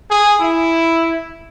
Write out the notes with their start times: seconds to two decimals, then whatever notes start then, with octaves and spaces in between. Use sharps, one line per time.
0.10 G#4
0.39 E4